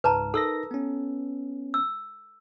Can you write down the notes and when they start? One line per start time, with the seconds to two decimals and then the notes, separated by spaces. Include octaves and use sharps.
0.04 C#2 G#2 B4 A5 A#5
0.34 D#4 A4 A#4 E6 A#6
0.71 B3 C#4
1.74 E6